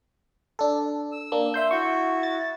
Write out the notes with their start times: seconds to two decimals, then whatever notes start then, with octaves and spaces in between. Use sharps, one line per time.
0.59 D4 A4
1.12 E6
1.32 A#3 D4
1.54 E5 C6 G6
1.71 E4 F#4 C#6
2.23 A6